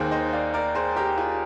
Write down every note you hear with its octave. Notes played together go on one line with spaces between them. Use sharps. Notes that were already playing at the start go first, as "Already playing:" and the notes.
Already playing: D#2 D#3 A#3 G#4 C5
C5 D#5
D5 F5
A#4 D5
G#4 C5
G4 A#4
F4 G#4